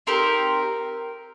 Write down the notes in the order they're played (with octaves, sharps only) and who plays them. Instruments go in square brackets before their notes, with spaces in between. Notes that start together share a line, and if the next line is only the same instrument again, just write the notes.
[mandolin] C4 D#4 G4 A#4